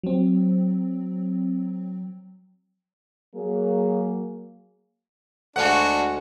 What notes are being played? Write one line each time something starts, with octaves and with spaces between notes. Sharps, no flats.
F#3 C4
F#3 A#3 G#4
D2 G#3 D4 F#4 F5 F#5